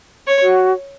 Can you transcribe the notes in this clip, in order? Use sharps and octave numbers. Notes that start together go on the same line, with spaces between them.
C#5
F#4